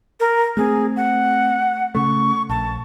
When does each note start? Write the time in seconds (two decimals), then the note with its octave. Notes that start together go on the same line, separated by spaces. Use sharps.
0.20 A#4
0.57 A3 A#3 C4 G#4
0.96 F#5
1.95 C#3 A3 C#6
2.49 A#1 A5